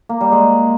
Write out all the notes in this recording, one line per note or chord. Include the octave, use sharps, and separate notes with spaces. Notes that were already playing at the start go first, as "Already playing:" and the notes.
A#3
G3
G#3